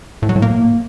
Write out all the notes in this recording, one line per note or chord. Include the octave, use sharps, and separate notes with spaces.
A2
F#3
A2
A#3